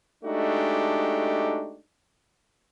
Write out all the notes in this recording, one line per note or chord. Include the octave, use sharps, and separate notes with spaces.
G#3 A3 D4 D#4 F#4 G4